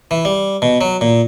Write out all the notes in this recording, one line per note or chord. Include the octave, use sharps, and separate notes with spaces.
E3
G3
B2
F#3
A#2